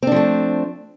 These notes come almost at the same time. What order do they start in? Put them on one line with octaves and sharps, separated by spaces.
C4 D4 F3 A3